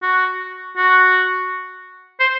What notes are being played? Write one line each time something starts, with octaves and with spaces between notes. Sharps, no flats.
F#4
F#4
C5